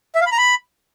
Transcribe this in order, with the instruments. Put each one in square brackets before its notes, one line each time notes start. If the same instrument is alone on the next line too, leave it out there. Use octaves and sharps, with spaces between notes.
[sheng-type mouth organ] E5
F5
B5
A#5
B5